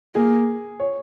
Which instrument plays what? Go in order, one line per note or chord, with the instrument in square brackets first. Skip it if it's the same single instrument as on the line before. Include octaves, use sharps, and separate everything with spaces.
[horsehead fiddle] A#3 [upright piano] G#4
[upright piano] C#5